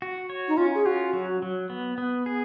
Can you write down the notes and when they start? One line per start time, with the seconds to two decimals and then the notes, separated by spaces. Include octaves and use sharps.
0.02 F#4
0.30 C#5
0.48 D#4
0.57 C#4 F4
0.75 G#4
0.86 F4 F#4
1.13 F#3
1.42 F#3
1.70 B3
1.98 B3
2.26 G#4